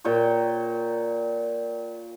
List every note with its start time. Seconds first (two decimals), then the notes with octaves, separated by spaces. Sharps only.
0.04 A#2 C#5 G5 C#6